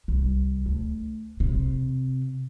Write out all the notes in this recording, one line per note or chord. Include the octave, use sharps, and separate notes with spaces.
C2
D2
C3